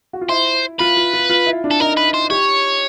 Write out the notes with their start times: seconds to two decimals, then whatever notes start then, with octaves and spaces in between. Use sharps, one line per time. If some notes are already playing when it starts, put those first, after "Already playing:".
0.13 F#4
0.21 F4
0.29 E4 C5
0.80 F4 B4
0.97 F4
1.14 F4
1.30 F4
1.47 E4
1.64 D4
1.71 A4
1.80 D#4 A#4
1.97 B4
2.14 C5
2.30 G4 C#5